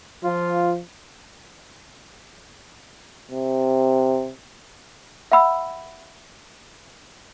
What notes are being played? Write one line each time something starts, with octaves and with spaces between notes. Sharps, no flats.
F3 F4
C3
E5 F#5 B5 E6